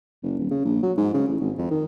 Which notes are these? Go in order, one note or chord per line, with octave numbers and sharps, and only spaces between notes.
F#1
D#1
C#3
A#1
F#3
G#2
C#3
A1
G#1
F2
D#3